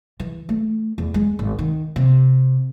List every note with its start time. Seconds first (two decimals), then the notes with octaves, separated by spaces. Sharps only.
0.20 E3
0.49 A3
0.98 E2
1.14 G#3
1.39 G#1
1.59 D#3
1.96 C3